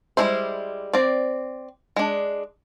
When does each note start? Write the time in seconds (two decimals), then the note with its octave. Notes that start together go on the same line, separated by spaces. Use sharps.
0.17 G3 G#3 D4 E4 C5
0.93 C4 D5
1.96 G#3 D4